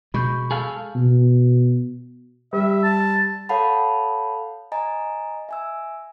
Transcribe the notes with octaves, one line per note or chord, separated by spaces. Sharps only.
B2 G#3 B5 C#6 G6
G#4 A4 F5
B2
G3 E5
A5
A4 C#5 F5 F#5 A5 B5
D#5 G#5 A#5
E5 G#5 E6